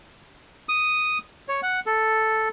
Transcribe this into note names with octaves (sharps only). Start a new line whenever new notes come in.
D#6
C#5
F#5
A4